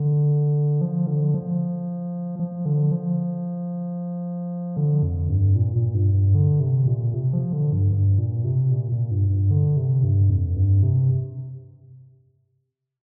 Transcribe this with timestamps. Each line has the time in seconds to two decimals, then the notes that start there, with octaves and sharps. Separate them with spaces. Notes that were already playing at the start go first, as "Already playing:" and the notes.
Already playing: D3
0.81 F3
1.07 D3
1.34 F3
2.39 F3
2.66 D3
2.91 F3
4.76 D3
5.03 F2
5.29 G2
5.56 A#2
5.76 A#2
5.94 G2
6.14 G2
6.34 D3
6.60 C3
6.86 A#2
7.14 C3
7.33 F3
7.53 D3
7.73 G2
7.92 G2
8.18 A#2
8.45 C3
8.71 A#2
8.92 A#2
9.11 G2
9.30 G2
9.50 D3
9.77 C3
10.03 G2
10.30 F2
10.56 G2
10.83 C3